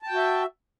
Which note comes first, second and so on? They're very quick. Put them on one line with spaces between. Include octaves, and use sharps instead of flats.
A5 G5 F#4 E5